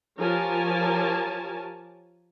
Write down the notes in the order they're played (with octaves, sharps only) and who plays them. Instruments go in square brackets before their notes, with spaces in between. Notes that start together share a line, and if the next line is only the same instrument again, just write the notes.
[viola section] F3 G4 A#4 C#5 G#5 A5